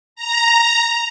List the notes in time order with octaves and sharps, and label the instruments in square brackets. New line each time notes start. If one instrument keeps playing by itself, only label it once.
[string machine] A#5